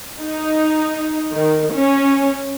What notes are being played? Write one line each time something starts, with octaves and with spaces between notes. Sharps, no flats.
D#4
D#3
C#4